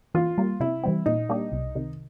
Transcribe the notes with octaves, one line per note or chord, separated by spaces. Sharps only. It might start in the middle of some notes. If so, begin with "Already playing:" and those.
E3 F4
G3 A#3
C3 E4
E3 G3 C4
A#2 D#4
G3 A#3 D4 G4
C2
C3 D#3